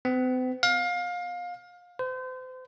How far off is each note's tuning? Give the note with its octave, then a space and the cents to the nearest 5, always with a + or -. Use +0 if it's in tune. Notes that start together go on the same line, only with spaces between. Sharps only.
C4 -45
F5 +25
C5 -35